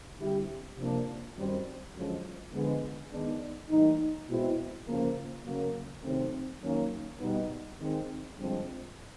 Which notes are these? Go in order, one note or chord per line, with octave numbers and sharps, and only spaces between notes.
D3 G3 C4 E4 G4
C3 F3 A#3 D4
F#2 D#3 G3 C4
F#2 D3 F3 G#3 C#4
D3 F3 G#3 B3
D#3 G#3 B3 D4
A2 E3 G3 A#3 D#4
B2 G#3 C4 E4
C#3 F3 A#3
C#3 F#3 A#3
C3 D#3 F#3 A3 C4
D#3 F#3 A#3 C#4
B2 G3 B3 D#4
D#3 G#3 C4
G2 D3 F3 G#3 C4